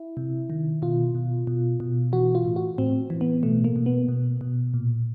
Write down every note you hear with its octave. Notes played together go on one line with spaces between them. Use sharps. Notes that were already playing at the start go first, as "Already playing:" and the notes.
Already playing: E4
C3
D#3
B2 F4
B2
B2
B2
E3 F#4
F4
A2
F#4
A2 C4
E3
B3
B2 A3
A#3
B2
B3
B2
B2
A#2